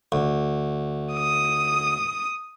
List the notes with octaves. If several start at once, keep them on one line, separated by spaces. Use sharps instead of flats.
D2
D#6